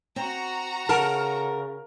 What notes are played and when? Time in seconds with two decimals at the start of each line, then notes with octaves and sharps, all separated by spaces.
0.16 C4 F#4 A#5
0.89 C#3 A4 A#4 F#5 A5